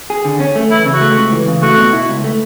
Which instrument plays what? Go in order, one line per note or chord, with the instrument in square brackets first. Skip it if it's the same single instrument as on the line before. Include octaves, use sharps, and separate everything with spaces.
[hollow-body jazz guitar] G#4
D3
C#4
A3
[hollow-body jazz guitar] E3 [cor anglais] E4
[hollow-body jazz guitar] C#3
[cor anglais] F#4
[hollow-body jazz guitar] A3
C#2
E3
C#3
[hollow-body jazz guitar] A3 [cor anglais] F#4
[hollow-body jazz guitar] B2
E4
C#2
A3